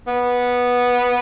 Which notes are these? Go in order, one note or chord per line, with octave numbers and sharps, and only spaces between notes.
B3